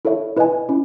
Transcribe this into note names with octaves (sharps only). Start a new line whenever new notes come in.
E4 A4 C#5 E5
E4 B4 D#5 G#5
C#4 E4